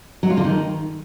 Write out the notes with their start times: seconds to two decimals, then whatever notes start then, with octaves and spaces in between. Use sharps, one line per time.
0.23 F#3
0.30 F4
0.37 D3
0.44 D#3